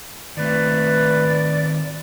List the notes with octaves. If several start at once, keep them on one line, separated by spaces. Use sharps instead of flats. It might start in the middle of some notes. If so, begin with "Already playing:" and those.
D#3 A3 C4 F4 B4 D5